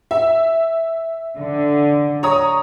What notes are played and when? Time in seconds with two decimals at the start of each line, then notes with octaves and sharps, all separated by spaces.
0.11 E5
1.38 D3
2.23 C#5 A#5 D#6